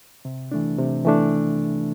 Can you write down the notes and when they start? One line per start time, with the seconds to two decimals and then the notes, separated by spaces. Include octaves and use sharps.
0.25 C3
0.52 E3 A3 D4
0.78 C3
1.05 E3 A3 D4